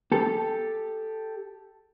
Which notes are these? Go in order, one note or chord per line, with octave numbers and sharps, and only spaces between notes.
G4 A4